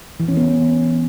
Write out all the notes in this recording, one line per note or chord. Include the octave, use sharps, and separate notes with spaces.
E3
C#4
B3